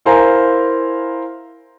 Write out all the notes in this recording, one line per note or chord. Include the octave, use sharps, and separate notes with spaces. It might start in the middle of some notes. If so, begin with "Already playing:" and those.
E4 A#4 C5 F5 G#5 A#5